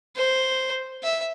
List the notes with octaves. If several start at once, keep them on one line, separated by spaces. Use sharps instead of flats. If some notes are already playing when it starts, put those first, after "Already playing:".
C5
E5